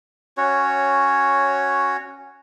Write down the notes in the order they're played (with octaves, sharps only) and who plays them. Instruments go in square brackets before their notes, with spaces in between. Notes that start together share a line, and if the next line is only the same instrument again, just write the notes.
[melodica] C#4 F#4 C#5